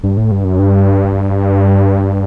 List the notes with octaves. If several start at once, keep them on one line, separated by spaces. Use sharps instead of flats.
G2
A2
G2
F#2
G2